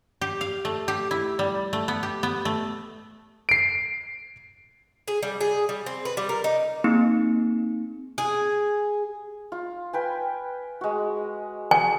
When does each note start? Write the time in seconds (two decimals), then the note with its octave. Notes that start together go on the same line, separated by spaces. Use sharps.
0.22 G4
0.41 F5
0.65 A3
0.88 G4
1.11 E4
1.39 G3
1.73 A3
1.88 B3
2.03 G4
2.23 B3
2.45 A3
3.49 C7 D7
5.08 G#4
5.23 G3
5.41 G#4
5.69 G3
5.86 C4
6.05 B4
6.17 G3
6.29 A#4
6.44 D#4
6.84 A#3 C4 D#4 G#4
8.18 G#4
9.52 F4
9.93 B4 G5 G#5
10.81 G#3 F#4
11.71 G#5